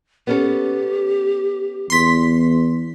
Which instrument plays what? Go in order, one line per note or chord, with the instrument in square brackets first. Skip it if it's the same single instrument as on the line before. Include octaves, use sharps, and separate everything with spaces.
[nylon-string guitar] B3 C#4 A4 [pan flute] G4
[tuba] E2 [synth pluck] C6 B6